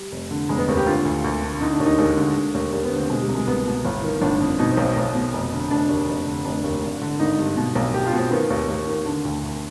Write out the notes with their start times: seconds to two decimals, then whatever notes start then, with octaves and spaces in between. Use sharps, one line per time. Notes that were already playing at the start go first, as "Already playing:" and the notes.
Already playing: G3
0.12 F1
0.31 D3
0.49 F1 G#3
0.58 B3
0.68 D#2 C4
0.77 G4
0.86 D3 F4
1.05 D2
1.24 D2
1.43 D3
1.61 D3 D#4
1.73 D4
1.80 D#2
1.86 D#4
1.98 D#2 G#3
2.17 D3
2.36 D3
2.54 D#2
2.72 D#2
2.85 B3
2.91 D3
2.97 C4
3.10 B2 G#3
3.22 G3
3.28 C2
3.35 G#3
3.47 C2 B3
3.66 B2
3.85 G1
4.03 D#3
4.21 G1 D4
4.40 F2
4.59 B2 D#4
4.71 C4
4.77 B1
4.84 C4
4.96 B1
5.15 B2
5.33 F1
5.52 D3
5.71 F1 D4
5.89 D#2
6.08 F1
6.27 D3
6.45 F1 D4
6.64 D#2
6.82 G#1
7.01 D3
7.19 G#1 D#4
7.38 G2
7.57 B2
7.75 B1
7.94 B1 G4
8.07 F4
8.13 B2
8.19 C4
8.31 D#3 B3
8.50 D#2
8.68 D#2
8.88 D#3
9.06 D3 D4
9.24 D2
9.43 D2